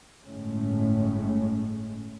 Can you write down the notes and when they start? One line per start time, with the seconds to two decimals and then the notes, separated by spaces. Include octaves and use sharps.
0.23 G1 A2 G#3 A3 C#4